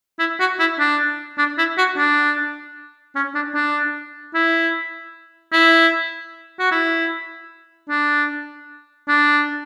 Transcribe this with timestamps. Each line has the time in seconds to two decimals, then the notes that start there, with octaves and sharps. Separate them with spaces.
0.19 E4
0.40 F#4
0.59 E4
0.79 D4
1.38 D4
1.58 E4
1.78 F#4
1.97 D4
3.15 C#4
3.35 D4
3.54 D4
4.34 E4
5.53 E4
6.59 F#4
6.71 E4
7.90 D4
9.08 D4